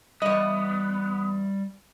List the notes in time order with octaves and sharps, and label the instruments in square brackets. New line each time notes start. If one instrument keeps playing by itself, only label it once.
[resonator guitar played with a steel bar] E2 D#5 [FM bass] G3 [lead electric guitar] B3